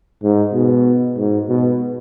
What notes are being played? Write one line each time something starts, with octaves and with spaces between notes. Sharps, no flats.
G#2
B2
G#2
B2